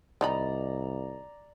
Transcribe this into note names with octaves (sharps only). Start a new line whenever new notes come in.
C2 D#3 D#4 D5 A#5 B5